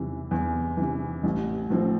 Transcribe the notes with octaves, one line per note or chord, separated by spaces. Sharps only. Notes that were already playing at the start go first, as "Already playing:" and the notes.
Already playing: E2 C3 E3
E2
C3 E3
A1
A2 F3 C4